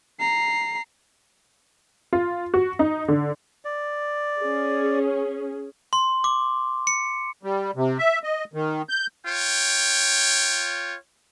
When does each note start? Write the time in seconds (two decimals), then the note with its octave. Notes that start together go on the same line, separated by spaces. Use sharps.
0.20 A#5 C7
2.13 F4
2.54 F#4
2.79 D#4
3.08 D3
3.65 D5
4.41 C#4 G#4
5.93 C6
6.24 D6
6.87 C#7
7.43 G3
7.76 C3
7.99 E5
8.24 D#5
8.54 D#3
8.89 G6
9.27 F4 C#5 G5